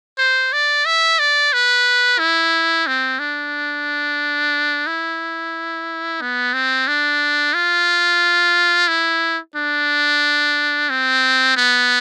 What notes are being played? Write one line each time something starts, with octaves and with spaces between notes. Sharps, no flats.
C5
D5
E5
D5
B4
E4
C4
D4
E4
B3
C4
D4
F4
E4
D4
C4
B3